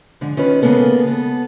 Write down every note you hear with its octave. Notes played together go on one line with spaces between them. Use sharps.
G#2 D3 F3
D#3 C#4 F4 B4
C#3 G#3 A#3 B3 A4
B3 A4